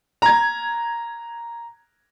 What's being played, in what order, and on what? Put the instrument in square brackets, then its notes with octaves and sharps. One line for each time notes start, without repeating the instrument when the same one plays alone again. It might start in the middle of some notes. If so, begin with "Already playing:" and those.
[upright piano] A#5 G#6